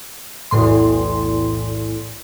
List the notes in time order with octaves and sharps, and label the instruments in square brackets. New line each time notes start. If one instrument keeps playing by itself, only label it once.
[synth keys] B1 E2 A2 C6